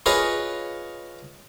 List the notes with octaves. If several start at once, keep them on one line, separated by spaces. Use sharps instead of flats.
F4 G#4 B4 C#5 D#5 F5